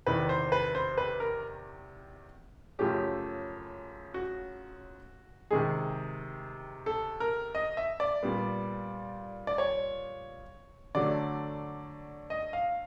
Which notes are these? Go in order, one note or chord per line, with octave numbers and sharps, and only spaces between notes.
E2 C3 D#3 B4
C5
B4
C5
B4
A#4
F#2 C#3 F3 A3 C#4 G4
F#4
C3 D#3 G#3 G#4
A4
A#4
D#5
E5
D5
A#2 G3 B3
D5
C#5
D3 F#3 A3 D5
D#5
F5